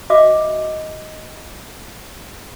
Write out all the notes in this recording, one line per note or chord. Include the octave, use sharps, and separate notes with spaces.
F#4 D#5 E5 D6